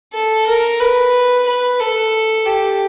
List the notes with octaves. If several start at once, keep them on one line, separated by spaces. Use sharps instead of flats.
A4
A#4
B4
B4
A4
G4